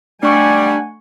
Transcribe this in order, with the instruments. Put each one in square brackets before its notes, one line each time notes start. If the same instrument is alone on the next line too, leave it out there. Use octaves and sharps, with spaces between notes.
[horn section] G3 [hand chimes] A3 C#6 C#7 [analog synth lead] D4 [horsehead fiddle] F#5 G#5